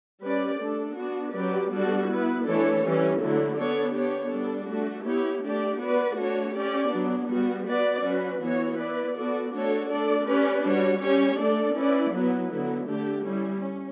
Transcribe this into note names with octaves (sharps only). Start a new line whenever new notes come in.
G3 C#4 G4 B4 D5
A3 D4 A4
B3 D4 F#4
F#3 C#4 G4 B4 D5
G3 B3 D4 F#4 A4
B3 E4 B4
E3 A3 D4 A4 C#5
E3 G3 C#4
D3 F#3 A3 E4
B3 D4 A4 C#5
B3 D4 G4 C#5
G3 B3 D4 A4
A3 D4 F#4
B3 E4 G4 C#5
A3 D4 G4 D5
B3 F#4 B4 D5
A3 D4 F#4 C#5
C#4 G4 D5
F#3 B3 D4
G3 B3 F#4
B3 F#4 B4 D5
F#3 C#4 F#4 B4
E3 B3 F#4 C#5
B3 E4 B4 D5
B3 F#4 A4 D5
A3 D4 F#4 A4 C#5
A3 D4 A4 D5
C#4 G4 B4 D5
G3 D4 F#4 C#5
G3 C#4 G4 C#5
A3 D4 A4 D5
C#4 E4 B4 D5
F#3 B3 E4 B4
D3 F#3 B3 E4
D3 A3 D4 G4
G3 C#4 E4
C#4